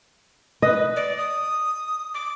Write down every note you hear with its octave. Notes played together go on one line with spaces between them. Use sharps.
B4 D#5
D5
D#6
D6